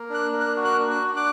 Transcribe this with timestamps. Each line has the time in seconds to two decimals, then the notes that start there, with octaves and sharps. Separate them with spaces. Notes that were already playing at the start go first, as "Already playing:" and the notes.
Already playing: A#3
0.10 D4 F#6
0.33 A#3
0.40 F#6
0.56 F#4
0.65 F#6
0.79 D4
0.90 F#6
1.02 D4
1.16 D6 F#6